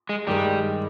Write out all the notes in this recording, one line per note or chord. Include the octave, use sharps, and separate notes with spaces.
G#3
G2 D#3 G3 G#3